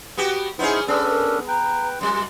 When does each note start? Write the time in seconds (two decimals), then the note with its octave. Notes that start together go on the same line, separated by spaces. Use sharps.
0.18 B3 F#4 G4
0.59 B3 C#4 D#4 E4 G#4 C5
0.88 B3 C#4 D4 A4 D5
1.09 A#4
1.48 B4 G5 A#5
2.01 F#2 G3 C6